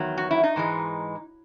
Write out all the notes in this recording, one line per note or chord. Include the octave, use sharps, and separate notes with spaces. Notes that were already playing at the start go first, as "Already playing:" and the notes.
Already playing: E2 D#3 F#3
F#4
E4
D#4
G#2 E3 G#3